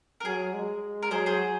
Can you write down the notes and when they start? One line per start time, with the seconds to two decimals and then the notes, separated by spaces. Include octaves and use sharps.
0.20 A#4
0.25 F#3 G#4
0.54 G#3
1.03 A#4
1.11 F#3 G#4 C5
1.26 G#4 C5